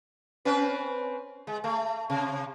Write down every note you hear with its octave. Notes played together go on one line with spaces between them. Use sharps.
C4 C#4 B4
G#3
A3
C3